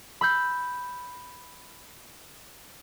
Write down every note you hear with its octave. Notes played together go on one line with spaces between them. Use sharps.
B5 E6 G6